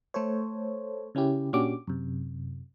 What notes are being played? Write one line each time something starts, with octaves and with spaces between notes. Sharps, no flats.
A3 A4 C5 C#5
C#3 C#4 E4 G4
A#2 C#4 D4 F#4 G4 D6
F#2 C3